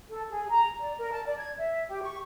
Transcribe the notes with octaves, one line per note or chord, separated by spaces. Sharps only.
A4
G#4
A#5
D5
A#4
A5
D5
G#6
E5
G4
C#6